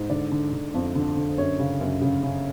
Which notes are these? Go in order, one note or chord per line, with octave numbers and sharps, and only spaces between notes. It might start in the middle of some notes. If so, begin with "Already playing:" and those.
Already playing: G#2
D3 D5
D3
D3
F2
D3
D3
F#2 C#5
C#3
F#2
C#3
C#3